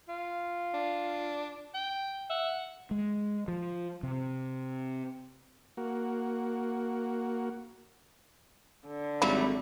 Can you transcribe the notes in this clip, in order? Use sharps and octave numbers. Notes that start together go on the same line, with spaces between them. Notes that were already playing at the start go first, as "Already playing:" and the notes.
F4
D4
G5
E5 F#5
G#3
F3
C3
A#3 F#4
D3
G#1 F#3 G3 A3 F5 B5